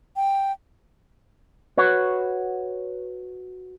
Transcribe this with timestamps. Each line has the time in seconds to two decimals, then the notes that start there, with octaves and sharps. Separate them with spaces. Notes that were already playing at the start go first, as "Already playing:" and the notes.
0.16 G5
1.77 F#4 B4 C#5